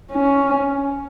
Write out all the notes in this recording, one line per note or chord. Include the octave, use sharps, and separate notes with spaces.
C#4